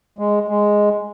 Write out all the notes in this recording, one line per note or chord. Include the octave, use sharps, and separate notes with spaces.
G#3
G#3